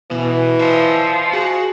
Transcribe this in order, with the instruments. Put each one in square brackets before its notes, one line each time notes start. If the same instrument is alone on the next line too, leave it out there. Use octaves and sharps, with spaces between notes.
[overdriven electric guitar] B2 [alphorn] E3
[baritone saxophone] F3 [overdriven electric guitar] D#5 E5
[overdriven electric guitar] F#4 [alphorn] G#4